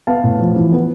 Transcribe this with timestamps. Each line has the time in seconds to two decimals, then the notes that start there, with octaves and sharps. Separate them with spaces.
0.07 B3 F5 A5
0.24 A2
0.39 F3
0.56 E3
0.72 B3